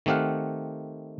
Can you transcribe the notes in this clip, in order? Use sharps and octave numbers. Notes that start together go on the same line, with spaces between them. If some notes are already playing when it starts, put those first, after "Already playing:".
D#3 A3 C4 G4 F5 F#5